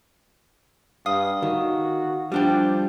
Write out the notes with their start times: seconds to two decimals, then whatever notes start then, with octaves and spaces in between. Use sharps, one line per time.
1.06 G2 F5 D#6
1.42 D#3 F#4
2.32 F3 G3 D4 G4